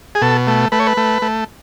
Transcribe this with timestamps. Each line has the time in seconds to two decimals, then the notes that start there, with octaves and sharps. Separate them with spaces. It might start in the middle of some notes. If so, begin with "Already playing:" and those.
0.15 G#4
0.22 B2 A4
0.47 A3
0.72 A3 B4
0.80 C#5
0.87 B4
0.97 A3
1.22 A3